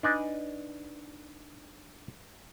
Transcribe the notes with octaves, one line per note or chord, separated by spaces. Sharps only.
D4 D#4 B4 D5 D#5 G#5